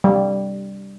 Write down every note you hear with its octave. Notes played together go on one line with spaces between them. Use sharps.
G3